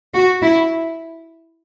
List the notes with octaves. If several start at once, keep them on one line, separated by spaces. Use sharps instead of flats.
F#4
E4